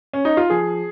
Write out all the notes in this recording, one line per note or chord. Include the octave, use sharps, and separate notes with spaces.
C#4
D#4
F4
F3 G#4